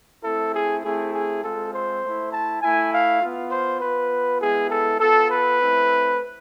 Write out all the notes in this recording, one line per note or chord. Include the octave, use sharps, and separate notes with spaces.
A3 C4 E4 A4
G#4
A3 C4 E4 G#4
G#4
G#3 C4 F4 A4
C5
A3 E4
A5
A3 E4 G#5
F5
B3 F4
C5
B3 F4 B4
G#3 B3 E4 G#4
A4
B3 F4 A4
B4
A3 C4 E4